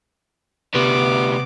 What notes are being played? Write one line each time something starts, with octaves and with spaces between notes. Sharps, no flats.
D2 C3 G3 B3 D6